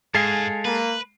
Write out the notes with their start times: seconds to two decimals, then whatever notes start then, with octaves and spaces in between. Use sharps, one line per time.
0.15 G#2 G#3 A4 F5 G#5 C7
0.65 A#3 B4